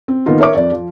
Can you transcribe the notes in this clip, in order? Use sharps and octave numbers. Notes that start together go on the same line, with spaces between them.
C4
D#3 A#3 B3 D#4 F4
A#4 C#5 E5 C#6 D6
F2 D5
F3